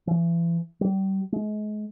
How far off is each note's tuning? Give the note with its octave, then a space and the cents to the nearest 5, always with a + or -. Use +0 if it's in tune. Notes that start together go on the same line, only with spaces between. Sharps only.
E3 +40
G3 -30
G#3 +35